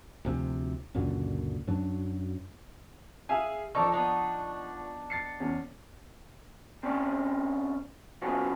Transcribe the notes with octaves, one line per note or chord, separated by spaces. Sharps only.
D2 C3 F3
C#2 F#2 A#2 D3
F#2 F#3 D4
G#4 E5 F5 G#5
F3 D#4 A4 A#4 D5 C#6
B3 D4 D#4
A6 C7 C#7
E2 C#4
G2 C4 C#4 D5
C#3 F#3 B3 F4 F#4 A4